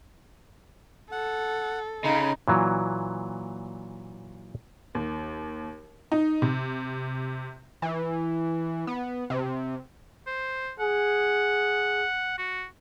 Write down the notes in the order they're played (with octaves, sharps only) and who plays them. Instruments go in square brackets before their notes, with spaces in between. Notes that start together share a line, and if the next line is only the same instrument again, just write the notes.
[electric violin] A4 [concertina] F#5
[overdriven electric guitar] C#3 [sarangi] D#4 [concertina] B5 C6
[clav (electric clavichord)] A#2 E3 F#3
[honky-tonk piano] D#2
D#4
C3
[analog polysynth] E3
B3
C3
[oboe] C5
[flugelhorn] G#4 [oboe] F#5
[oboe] F#4